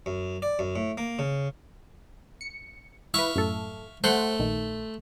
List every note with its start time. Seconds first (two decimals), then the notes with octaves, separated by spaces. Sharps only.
0.06 F#2
0.42 D5
0.59 F#2
0.76 A2
0.98 A#3
1.19 C#3
2.41 C#7
3.14 E4 B4 E5 F5 C#6
3.36 F#2 A2 A4
4.04 A3 A4 C5 F#5 C6
4.40 A#1 D#3